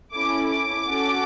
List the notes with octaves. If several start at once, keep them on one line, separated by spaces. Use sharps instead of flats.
C#4 E4 A4 D6
D6
C#4 F#4 A4